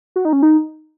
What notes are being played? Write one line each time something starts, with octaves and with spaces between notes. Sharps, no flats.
F#4
D#4
C#4
D#4